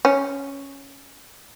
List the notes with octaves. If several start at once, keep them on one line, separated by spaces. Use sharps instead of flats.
C#4